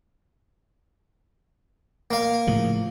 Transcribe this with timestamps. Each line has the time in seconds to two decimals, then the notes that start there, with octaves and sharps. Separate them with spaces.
2.11 A#3 F5
2.47 A2 C#3 F3